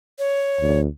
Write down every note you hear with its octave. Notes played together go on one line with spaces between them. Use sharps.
C#5
D2